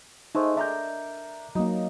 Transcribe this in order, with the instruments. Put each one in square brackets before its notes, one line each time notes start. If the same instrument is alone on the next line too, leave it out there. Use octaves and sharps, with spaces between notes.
[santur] G#3 A3 [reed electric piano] D#4 C5
[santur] D4 A#4 [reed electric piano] E5 A#5 G6
[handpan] F#3 A#3 [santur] D#4